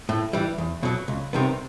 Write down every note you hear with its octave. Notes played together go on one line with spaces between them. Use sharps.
A2
E3 G3
E2
B2 F#3
C#2
C3 D#3 G3 B3